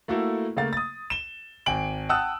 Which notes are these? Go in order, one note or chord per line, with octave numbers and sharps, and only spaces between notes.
A3 A#3 E4 F#4 A4
C#3 A3 A#3 F5 A6
D#6 A6
E7 G7
G#1 G5 G#5 D7 F#7
F#5 G5 A5 D#6 E6 F#6